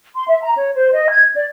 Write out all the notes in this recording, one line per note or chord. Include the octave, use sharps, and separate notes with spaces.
C6
E5
A#5
C#5
C5
D#5
G#6
D5